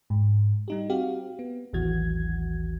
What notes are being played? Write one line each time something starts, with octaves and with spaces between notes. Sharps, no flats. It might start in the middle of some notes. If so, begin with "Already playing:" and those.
G#2
G3 D#4 G4
C4 F#4 G4 F5
B3
A1 D#2 E3 F#3 F#4 G#6